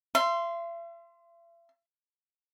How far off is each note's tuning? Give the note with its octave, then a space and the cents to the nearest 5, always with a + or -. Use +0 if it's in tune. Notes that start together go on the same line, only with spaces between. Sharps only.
E5 +45 C6 -5